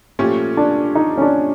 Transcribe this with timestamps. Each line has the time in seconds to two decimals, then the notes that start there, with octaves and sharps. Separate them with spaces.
0.19 A#2 F3 A3 C#4 G4
0.57 D4
0.95 D#4
1.18 C#4
1.22 D4